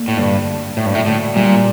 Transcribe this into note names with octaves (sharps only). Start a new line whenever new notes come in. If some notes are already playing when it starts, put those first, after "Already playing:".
Already playing: D2 A#3
A2
G2 D3
D3
D2 A2
G2
A2
D2 A2
A#2 G3